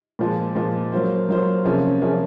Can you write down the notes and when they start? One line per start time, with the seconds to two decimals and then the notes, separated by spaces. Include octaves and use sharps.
0.19 A#2 F3 G#3
0.55 A#2 F3 G#3
0.92 F#3 A#3 F4 C5
1.29 F#3 A#3 F4 C5
1.65 C3 F3 A#3 C#4 G#4
2.01 C3 F3 A#3 C#4 G#4